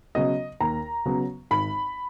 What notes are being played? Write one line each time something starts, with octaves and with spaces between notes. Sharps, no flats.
C#3 F#3 B3 D#5
D#2 A#5
C#3 F#3 B3
G#1 B5